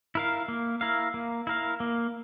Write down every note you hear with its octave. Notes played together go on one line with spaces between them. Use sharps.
E4 A#4 F5
A#3
E4 A#4 F5
A#3
E4 A#4 F5
A#3